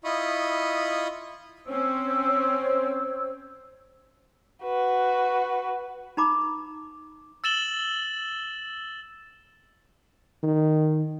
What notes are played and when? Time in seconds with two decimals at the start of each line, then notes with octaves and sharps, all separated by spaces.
0.04 E4 F4 D#5 B5 C#6 D#6
1.67 C4 C#4 C5 C#5 E6
4.63 F#4 B4
6.17 D#4 A#5 B5 D6
7.44 E6 A6 E7 F#7 G7
10.43 D#3